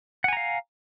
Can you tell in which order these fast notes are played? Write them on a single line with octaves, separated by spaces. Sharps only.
F#5 G#5 A#5 F5